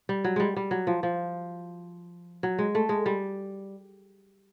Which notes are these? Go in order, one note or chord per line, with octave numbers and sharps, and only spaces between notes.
G3
F#3
G3 G#3
G3
F#3
F3
F3
F#3
G#3
A3
G#3
G3